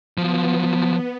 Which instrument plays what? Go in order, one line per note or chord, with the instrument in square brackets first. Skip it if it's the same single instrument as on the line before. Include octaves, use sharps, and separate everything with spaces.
[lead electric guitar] F3 F#3 [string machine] B3